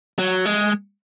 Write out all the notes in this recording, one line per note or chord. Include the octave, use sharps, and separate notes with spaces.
F#3
G#3